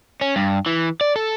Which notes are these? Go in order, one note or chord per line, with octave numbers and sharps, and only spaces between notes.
C#4
G2
E3
D5
A4